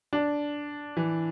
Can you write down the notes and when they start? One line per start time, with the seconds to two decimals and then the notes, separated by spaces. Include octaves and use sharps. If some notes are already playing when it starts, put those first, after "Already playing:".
0.13 D4
0.97 E3